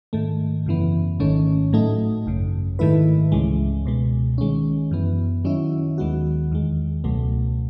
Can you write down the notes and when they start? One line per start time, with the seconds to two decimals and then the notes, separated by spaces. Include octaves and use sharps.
0.13 G#2 D#3 A3
0.66 F#2 C#3 E3 B3
1.20 G#1 G#2 D#3 A3 C#4
1.73 A2 F#3 A3 D#4
2.26 G#1 F#2 C#3
2.79 G#2 D#3 A3 E4 B4
3.32 C#2 C#3 E3 G#3
3.85 C#2 B2 G#3
4.38 D#3 G#3 C#4
4.91 F#2 E3 B3
5.45 D#3 F#3 C#4 E4
5.98 D#2 D#3 G#3 B3 F#4
6.51 E2 D#3 G#3
7.04 C#2 B2 F#3 A3